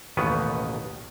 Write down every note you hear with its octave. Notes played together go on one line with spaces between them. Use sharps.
A1 D#2 B2 D#3 B3 B4